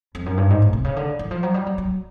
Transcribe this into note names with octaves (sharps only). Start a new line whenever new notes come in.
F2
F#2
G2
G#2
A2
C3
C#3
D3
E3
F3
F#3
G3
F#3
F#3